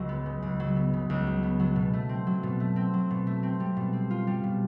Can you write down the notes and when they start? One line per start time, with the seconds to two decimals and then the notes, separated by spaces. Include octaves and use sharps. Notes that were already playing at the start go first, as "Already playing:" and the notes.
Already playing: C#2 F#3
0.09 B3
0.26 C#3
0.42 C#2
0.60 F#3
0.76 B3
0.93 C#3
1.10 C#2
1.27 F#3
1.43 B3
1.60 F#3
1.76 B2
1.93 A3
2.09 C4
2.27 F#3
2.43 B2
2.60 A3
2.76 C4
2.94 F#3
3.11 B2
3.27 A3
3.43 C4
3.60 G3
3.77 B2
3.93 C4
4.10 F4
4.27 G3
4.44 B2